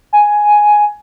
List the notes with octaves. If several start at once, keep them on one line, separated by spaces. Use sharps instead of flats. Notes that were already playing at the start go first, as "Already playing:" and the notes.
G#5